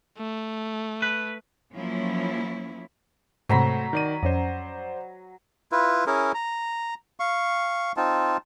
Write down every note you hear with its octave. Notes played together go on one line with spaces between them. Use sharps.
A3
B4
F3 F#3 A#3 C#4 E4
G#2 C3 F#3 A3 C5 A#5 B5
D#3 D5 D#7
F2 C#4 C5 D5
E4 F4 B4
C#4 E4 G#4 A#4
A#5
F5 C#6
C4 D#4 F4 A5